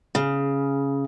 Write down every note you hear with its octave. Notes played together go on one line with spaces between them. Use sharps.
C#3